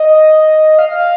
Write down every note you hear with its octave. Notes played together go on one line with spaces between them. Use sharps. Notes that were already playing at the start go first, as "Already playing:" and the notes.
Already playing: D#5
F5